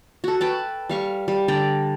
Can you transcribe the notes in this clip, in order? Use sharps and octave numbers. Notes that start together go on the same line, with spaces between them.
F#4 A4
B4 G5 A5
G3 F5 C#6
G3
D3 D5 G5 A#5